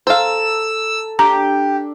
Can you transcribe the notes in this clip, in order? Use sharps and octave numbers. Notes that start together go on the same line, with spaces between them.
A4 C5 F5 A5 A#5 E6
D4 G4 A#5